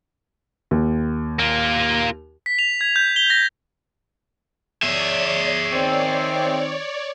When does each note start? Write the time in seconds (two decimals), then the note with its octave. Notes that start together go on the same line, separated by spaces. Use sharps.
0.71 D#2
1.39 A#3 F4
2.46 B6
2.59 F7
2.81 G#6
2.96 G6
3.16 G7
3.30 A#6
4.83 G#4 C#5 D5 E5
5.72 D#3 C4